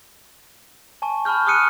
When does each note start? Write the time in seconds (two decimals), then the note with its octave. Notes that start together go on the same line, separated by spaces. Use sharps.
1.02 G#5 A5 C#6
1.25 A5 B5 C#6 F6 G6
1.47 C#6 D#6 F6 F#6 C#7 D#7